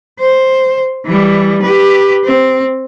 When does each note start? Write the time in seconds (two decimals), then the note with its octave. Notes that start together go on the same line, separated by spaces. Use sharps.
0.20 C5
1.05 E3 G3
1.62 G4 B4
2.25 C4